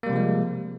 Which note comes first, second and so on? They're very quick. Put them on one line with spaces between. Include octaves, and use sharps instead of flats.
A#3 G3 C3 F3 G#3